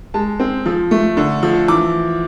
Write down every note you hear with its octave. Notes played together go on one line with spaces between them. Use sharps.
G#3 A5
C4
F3
A3
D3
F3
E3 D6